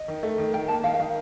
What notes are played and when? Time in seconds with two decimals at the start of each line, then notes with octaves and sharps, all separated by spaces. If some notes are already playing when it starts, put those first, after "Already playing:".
Already playing: D#5
0.08 D#3
0.23 A3
0.38 D#3
0.53 D#3 G5
0.68 A#3 A5
0.83 D#3 F5
0.94 F5
0.99 D#3 D#5